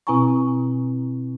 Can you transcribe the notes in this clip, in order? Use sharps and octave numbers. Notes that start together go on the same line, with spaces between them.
B2 C4 E4 G#5 A#5 C#6